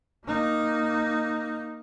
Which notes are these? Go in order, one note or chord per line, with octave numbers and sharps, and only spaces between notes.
A#3 D#4